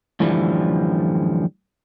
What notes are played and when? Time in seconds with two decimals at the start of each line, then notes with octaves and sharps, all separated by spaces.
0.20 F#2 A2 D3 E3 F3 G3